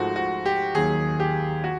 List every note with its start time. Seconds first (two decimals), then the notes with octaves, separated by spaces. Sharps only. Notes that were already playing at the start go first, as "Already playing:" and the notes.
Already playing: G#2 F3 A3 F#4
0.16 F#4
0.46 G4
0.75 D#2 D#3 F#3 G#4
1.20 G4
1.64 F#4